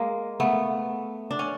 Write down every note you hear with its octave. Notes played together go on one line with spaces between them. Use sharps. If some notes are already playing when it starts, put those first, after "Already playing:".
Already playing: G#3 A#3
A3 B3
D4
C#4